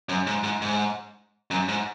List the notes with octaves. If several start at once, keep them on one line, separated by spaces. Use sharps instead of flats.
F#2
G#2
G#2
G#2
F#2
G#2